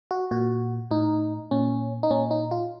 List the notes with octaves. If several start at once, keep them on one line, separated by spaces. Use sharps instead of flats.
F#4
A#2 F#4
A2 D#4
A#2 C#4
D#4
A#2 C#4
D#4
F4